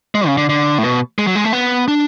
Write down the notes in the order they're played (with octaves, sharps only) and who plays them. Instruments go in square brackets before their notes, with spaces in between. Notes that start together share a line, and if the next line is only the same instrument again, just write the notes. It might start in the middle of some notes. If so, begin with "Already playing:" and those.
[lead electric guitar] G#3
C#3
D3
D3
A2
B2
G#3
F#3
G#3
A3
B3
D4